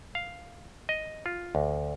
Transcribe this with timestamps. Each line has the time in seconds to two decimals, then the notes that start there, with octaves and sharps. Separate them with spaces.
0.15 F5
0.89 D#5
1.26 F4
1.55 D2